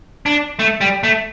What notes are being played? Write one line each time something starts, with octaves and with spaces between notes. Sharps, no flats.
D4
A3
G3
A3